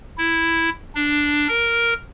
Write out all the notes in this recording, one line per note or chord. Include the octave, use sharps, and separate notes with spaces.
E4
D4
A#4